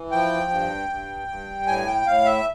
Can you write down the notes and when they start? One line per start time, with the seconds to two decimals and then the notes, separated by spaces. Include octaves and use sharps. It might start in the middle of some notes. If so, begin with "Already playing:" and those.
Already playing: E3
0.11 F3 G5
0.50 G2
0.89 G2
1.28 G2
1.67 A2 G#5
1.87 G5
2.06 A2 F5
2.25 E5